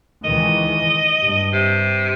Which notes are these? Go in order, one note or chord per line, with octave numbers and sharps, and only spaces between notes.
C#2 D#3 E3 D#5
G2
C3